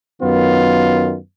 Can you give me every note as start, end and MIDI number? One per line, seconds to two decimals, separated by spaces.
0.22 1.17 42
0.22 1.17 51
0.22 1.17 59
0.22 1.17 65